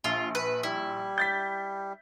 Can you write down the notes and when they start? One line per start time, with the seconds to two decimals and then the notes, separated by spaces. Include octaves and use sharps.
0.04 A#1 F4
0.35 B4
0.63 G3 E4
1.18 G6 A6 B6